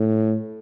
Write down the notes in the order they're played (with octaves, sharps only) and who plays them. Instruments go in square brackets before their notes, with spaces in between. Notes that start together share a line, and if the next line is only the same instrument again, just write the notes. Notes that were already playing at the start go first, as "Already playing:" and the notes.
Already playing: [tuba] A2